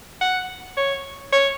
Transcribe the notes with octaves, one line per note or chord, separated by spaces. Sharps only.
F#5
C#5
C#5